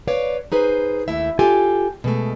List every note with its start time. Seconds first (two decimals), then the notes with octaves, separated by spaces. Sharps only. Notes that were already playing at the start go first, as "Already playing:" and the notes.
0.08 B4 C#5 D5 F5
0.52 D#4 G#4 B4 C5
1.08 D#2 A3 E4 E5
1.39 F4 G4 A4 G#5
2.04 B2 G#3 A3